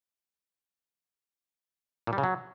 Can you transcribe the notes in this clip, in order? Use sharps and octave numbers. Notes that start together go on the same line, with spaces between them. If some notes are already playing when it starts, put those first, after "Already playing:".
A#2
G3
C#3
F#3